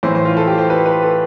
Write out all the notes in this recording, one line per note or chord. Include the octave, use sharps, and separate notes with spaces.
A2 E3 C5
C5
F4
A4
G4
C5
B4
B4
A4